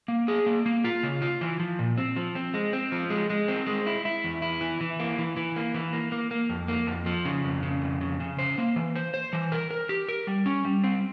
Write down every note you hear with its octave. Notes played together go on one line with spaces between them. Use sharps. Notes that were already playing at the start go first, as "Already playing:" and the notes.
A#3
G#4
A#3
A#3
F4
C#3
F4
E3
F3
A#2
C4
F3
C4
G#3
C4
F3
G#3
G#3
C4
G#3
E4
E4
E2
E4
E3
E3
A#3
E3
E3
A#3
E3
A#3
A#3
A#3
F2
A#3
F2
F3
C#3
F2
C#3
F2
C#3
C#3
C5
A#3
E3
C5
C5
E3
A#4
A#4
G4
A#4
G3
C#4
G3
C4